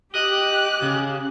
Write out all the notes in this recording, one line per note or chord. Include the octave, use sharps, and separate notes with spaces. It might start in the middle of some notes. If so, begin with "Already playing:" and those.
G4 D#5 F#6
C#3